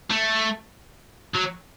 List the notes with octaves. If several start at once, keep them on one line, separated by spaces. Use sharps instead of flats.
A3
F#3